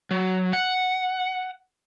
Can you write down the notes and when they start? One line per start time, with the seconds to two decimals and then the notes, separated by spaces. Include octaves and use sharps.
0.11 F#3
0.53 F#5